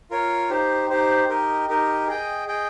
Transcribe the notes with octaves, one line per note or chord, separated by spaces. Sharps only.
F4 A#4 C#5
D#4 G4 C5
D#4 G4 C5
D#4 G4 A#4 D#5
D#4 G4 A#4 D#5
G#4 D#5 G5
G#4 D#5 G5